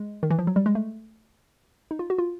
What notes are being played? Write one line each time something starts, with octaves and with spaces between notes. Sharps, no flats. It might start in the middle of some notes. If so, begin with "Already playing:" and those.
Already playing: G#3
D#3
E3
F3
F#3
G3
G#3
A3
D#4
F4
F#4
F4